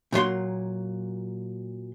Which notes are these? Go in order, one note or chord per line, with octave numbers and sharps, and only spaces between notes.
A#2 F#3 C#5 C6